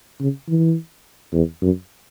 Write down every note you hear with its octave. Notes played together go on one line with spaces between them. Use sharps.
C#3
E3
E2
F#2